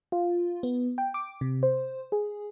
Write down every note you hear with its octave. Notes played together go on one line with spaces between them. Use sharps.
F4
B3
G5
D6
C3
C5
G#4